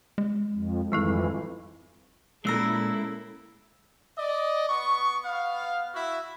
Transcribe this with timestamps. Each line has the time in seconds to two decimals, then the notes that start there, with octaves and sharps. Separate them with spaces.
0.18 G#3
0.52 F2
0.92 G#1 F2 E3 G3 E4 A4
2.45 A#2 G#3 C#4 E4 A4 A#4 E6 A#6
4.18 D5 D#5
4.70 B3 C#6
5.25 B3 F5
5.94 E4 F#4 E5